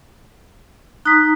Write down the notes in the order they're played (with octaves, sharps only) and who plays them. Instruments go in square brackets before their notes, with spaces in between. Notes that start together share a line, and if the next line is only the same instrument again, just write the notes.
[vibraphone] D#4 A#5 D#6 [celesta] F#6 B6